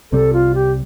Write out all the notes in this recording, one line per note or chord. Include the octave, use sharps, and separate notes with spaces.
C2 C3 G3 A4
F4
G4